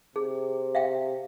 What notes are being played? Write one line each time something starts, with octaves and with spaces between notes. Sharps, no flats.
C3 G#4
E5 F5 G5